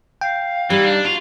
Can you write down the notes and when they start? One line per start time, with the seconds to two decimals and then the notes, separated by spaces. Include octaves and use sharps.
0.21 F5 G5
0.70 E3 G3 D#4 G4
0.85 D4
1.05 F4 F#4